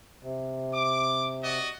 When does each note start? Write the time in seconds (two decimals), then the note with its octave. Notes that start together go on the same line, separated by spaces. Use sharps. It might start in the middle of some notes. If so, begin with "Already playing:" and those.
0.23 C3
0.74 D6
1.44 F#4 D5 D#5